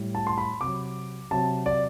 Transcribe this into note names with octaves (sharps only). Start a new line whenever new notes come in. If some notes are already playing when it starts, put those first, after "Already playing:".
Already playing: A2 G3
A5
C6
B5
C3 D6
F#3
C3 F#3 A5
D5